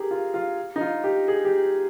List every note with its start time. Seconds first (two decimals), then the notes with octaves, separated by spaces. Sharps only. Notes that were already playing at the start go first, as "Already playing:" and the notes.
Already playing: G4 G#4 A#4
0.11 F4
0.34 F4
0.76 D#4
0.81 F4
1.04 G4
1.28 G#4
1.45 G4